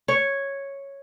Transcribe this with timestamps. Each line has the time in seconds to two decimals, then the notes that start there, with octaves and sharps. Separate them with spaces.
0.08 C#5